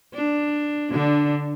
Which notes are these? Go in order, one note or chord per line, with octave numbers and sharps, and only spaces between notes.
D4
D3 D4